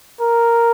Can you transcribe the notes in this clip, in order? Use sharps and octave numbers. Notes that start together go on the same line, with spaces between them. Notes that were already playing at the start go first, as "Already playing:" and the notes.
A#4